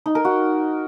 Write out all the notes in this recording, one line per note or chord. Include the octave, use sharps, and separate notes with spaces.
D#4
A#4
F#4